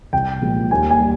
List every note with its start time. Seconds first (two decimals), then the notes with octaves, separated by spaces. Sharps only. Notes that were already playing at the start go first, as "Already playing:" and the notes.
0.13 C2 G5
0.41 A#2 F3 G#3
0.71 D#2 G#5
0.90 G#5
0.99 G3